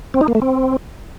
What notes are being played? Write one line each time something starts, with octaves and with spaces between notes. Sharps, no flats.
C4
D#4
A#3
A3
C4